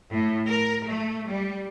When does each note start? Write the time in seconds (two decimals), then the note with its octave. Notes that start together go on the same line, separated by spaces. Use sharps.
0.13 A2
0.48 A#4
0.87 A3
1.30 G3